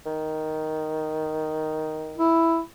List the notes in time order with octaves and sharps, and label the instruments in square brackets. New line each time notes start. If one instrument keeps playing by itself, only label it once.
[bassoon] D#3
[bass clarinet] E4